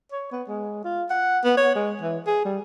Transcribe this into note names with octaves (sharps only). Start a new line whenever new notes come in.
C#5
B3
G#3
F4
F#5
B3
C#5
G#3
E3
G#4
G3